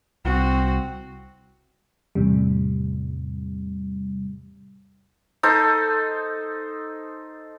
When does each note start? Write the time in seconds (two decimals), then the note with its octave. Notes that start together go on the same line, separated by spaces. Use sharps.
0.25 C2 C4 F#4
2.15 E2 A2 C3 G3
5.43 D#4 A4 C5